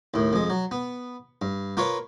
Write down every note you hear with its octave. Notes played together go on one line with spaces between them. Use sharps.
D#2 A2
F2 G#3
F#3
B3
G2
A#3 F4 B4 C#5 F5